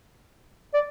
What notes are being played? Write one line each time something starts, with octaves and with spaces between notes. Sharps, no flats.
D5